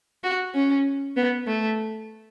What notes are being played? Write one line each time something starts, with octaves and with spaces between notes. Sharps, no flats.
F#4
C#4
B3
A3